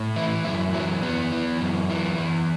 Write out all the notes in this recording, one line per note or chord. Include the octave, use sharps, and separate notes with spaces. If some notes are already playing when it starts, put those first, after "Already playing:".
Already playing: A2
E3 E4
F#2 E4
E3 F#3
E2 B3
E3
F#2
E3
E2